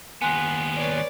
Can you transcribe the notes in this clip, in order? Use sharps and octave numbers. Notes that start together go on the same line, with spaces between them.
D#2 B3 G#5 C6 F#6
B4 C#5 D5